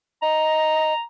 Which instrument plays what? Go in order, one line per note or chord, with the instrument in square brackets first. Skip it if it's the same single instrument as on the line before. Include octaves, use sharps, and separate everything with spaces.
[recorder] D#5 [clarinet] A#5